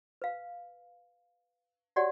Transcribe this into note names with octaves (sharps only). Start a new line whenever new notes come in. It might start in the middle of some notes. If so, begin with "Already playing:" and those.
B4 F5
F#4 G4 C#5 D5 F#5 G#5